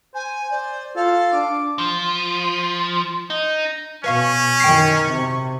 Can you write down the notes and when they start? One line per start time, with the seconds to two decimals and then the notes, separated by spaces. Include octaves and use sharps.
0.14 C5 G#5
0.51 C5 D5
0.96 F4 A4 F5
1.33 D4 D6
1.78 F3
3.30 D#4
4.04 B2 C#4 B4 F5 C#6
4.60 F#2 D#3 G5 C#6 C7
5.10 C3